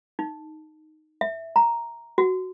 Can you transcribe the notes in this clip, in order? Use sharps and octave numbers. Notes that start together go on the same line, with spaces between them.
D#4
E5
A#5
F#4